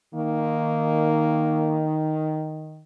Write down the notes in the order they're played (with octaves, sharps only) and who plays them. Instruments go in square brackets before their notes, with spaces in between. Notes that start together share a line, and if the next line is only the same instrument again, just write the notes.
[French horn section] D#3 [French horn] A#3